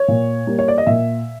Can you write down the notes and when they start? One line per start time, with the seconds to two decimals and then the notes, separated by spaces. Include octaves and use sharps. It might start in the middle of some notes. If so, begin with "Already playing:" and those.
Already playing: C#5
0.08 A#2
0.47 G3 A#3
0.59 C#5
0.68 D5
0.78 D#5
0.87 A#2 E5